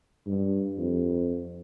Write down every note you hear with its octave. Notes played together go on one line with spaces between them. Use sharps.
G2
F2